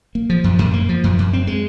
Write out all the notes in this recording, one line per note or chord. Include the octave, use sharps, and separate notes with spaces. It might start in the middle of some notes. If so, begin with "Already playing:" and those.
A#3
F3
F#2
F#2
A#3
F3
F#2
F#2
C4
G#3